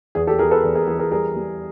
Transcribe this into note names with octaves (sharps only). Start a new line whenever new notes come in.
E2 G#4
G4 A4
E3 G#4 A#4
A4 B4
E2 G#4
G#4 A#4
E3 G#4
G#4 A#4
G3 G#4 A#4
G3